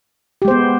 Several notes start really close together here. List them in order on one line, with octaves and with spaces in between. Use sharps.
G4 G#3 C5 B3